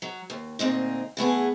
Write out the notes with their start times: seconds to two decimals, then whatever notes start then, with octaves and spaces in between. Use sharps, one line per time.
0.02 F#3
0.30 D#2
0.59 D2 A#2 C4 D#4
1.17 E3 A3 B3 G#4